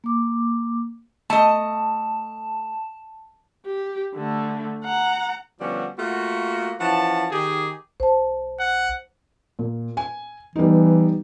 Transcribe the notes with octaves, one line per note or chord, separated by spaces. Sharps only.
A#3 D6
A3 D#5 A5
G4
D3 A3
F#5 A#5
D3 F3 G3 B3 C#4 F#4
A3 A#3 F4 F#4
E3 F3 C#4 F#5 A5
D#3 G4 G#4
B1 C5 A5
F#5
A#2
G#5
E3 G3 B3 D#4